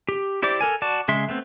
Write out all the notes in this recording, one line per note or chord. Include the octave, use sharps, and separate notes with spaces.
G4
E4 G4 C5 D5 D6
A4 A#4 G#5
F#4 D5 A5 D6
C#3 G#3 E5 C6
A3 B3 C4